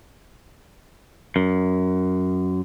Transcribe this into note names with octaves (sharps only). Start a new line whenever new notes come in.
F#2